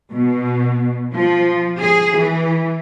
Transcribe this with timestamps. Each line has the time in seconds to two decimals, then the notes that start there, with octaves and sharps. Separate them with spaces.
0.13 B2
1.13 F3
1.81 G#4
2.19 E3